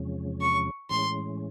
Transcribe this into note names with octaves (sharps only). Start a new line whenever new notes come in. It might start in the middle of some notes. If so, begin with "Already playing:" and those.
Already playing: E2 C3 F3 G#3 C#4
C#6
A2 E3 G#3 C#4 C6